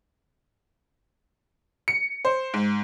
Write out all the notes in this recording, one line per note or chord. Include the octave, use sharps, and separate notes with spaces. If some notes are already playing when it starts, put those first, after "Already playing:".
C#7
C5
G#2